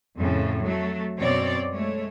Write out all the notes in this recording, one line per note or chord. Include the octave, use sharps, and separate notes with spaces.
F2 A2 C#3
F#3 A3
F#2 B2 C4 C#5 D5
G#3 A3 C#5